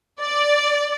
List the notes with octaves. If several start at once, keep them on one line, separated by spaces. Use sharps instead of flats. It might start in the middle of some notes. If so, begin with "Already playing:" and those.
D5